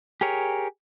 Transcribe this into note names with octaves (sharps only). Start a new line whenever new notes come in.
G4 G#4 A#4 C#5